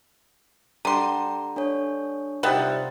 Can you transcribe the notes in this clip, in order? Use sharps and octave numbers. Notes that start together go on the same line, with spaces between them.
D3 G3 G5 A#5 C6
D4 A4 C#5
C3 G3 D#4 F4 D#5 E5 F#5 A6